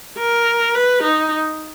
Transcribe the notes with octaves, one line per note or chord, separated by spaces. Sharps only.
A#4
B4
D#4